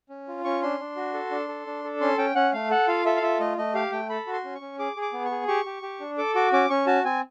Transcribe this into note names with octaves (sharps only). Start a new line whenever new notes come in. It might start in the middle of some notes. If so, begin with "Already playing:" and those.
C#4
F4
C#4 C#6
D4 C6
D4
F#4
A4
D4
A4
D4
A4
C#4 C6
C#4 G5
C#4 F#5
A3 F5
A4 F#5
F4 F5
A4 E5
F5
F4 E5
A3 D#5
A3 D#5
G4 F5
A3 G5
A4 B5
F#4
C6
C#4
C#6
C#4
G#4 D6
G#4
D6
B3
C#6
G#4
G4 C#6
G4
G4
D4
A4 D6
F#4 D6
C#4 D6
C#4 C#6
F#4 A5
C4 G#5